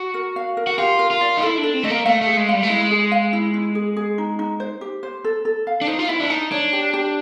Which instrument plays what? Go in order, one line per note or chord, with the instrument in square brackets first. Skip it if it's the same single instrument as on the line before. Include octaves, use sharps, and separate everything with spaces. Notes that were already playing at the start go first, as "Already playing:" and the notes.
Already playing: [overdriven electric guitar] F#4
[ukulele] A#4
F5
A#4
[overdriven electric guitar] F#4
[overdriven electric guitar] F4 [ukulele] G4
[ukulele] A#4
[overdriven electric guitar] F4
[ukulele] D5
[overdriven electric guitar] D#4
[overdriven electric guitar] E4 [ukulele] A4
[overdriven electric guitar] D4
[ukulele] A4
[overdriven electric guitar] C4
[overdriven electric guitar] A3 [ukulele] D#5
[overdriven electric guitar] A#3
[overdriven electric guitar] A3 [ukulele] F5
[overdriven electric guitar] A3
[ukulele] G#4
[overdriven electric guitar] G#3
[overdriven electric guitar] G3 [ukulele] F5
[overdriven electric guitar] A3
[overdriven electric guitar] G#3 [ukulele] E4
[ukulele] G#4
F5
E4
E4
G#4
G#4
D#4
D#4
C5
G4
C5
A4
A4
F5
[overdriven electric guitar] D4
[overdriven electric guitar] D#4 [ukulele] C5
[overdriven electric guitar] F4
[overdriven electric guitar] E4 [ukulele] E5
[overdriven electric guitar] D4
[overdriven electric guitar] D#4 [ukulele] A5
[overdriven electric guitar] D4 [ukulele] C#5
[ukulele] G4
G4